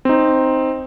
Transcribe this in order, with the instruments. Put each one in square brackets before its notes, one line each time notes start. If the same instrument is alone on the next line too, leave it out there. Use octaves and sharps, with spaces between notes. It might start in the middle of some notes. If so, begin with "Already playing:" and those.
[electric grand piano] C4 D#4